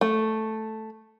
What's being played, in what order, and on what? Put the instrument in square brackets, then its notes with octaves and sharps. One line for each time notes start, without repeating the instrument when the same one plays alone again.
[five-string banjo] A3